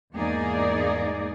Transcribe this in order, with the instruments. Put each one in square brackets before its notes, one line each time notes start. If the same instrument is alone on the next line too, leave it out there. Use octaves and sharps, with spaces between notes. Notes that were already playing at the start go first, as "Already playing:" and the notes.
[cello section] E2 G#2 A#3 D#4 G#4 D5